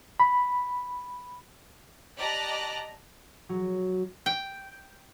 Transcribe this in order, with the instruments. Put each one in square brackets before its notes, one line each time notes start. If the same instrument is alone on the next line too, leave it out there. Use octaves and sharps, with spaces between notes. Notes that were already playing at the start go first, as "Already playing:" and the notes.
[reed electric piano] B5
[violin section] G4 D5 D#5 A5 A#5 F#6
[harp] F#3
[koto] G5